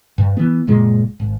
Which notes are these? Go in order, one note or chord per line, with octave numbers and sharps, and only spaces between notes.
G2
E3 B3
F#1 A#2 G#3
G#1